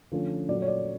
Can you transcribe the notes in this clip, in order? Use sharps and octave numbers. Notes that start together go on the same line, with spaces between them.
D3 F3 A3 C#4
A#2 F#3 A3 D5
C#5
D5